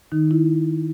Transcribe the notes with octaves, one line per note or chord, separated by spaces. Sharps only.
D#3 D#4
E4